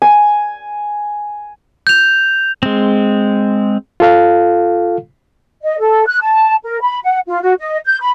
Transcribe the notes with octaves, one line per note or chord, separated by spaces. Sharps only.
G#5
G6 F7
G#3 C4
F4 A4 F5
D#5
A4
F#6
A5
A#4
B5
F#5
F4
F#4
D#5
G6
B5